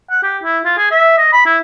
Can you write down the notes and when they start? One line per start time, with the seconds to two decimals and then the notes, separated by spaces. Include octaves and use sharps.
0.10 F#5
0.23 G4
0.43 E4
0.65 F4
0.78 G#4
0.91 E5
1.18 D#5
1.33 B5
1.45 E4